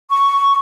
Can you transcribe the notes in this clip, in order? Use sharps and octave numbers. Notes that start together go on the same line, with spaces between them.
C#6